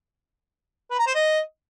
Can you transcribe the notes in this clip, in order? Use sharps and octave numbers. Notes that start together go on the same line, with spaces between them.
B4
A#5
C5
D#5